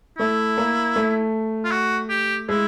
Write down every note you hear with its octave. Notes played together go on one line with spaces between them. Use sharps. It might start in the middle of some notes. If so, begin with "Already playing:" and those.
A3 E4
A#3
A3
F4
F#4
G4
G#3 E4